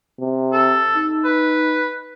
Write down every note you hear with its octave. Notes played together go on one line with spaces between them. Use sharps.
C3
A4
D#4
B4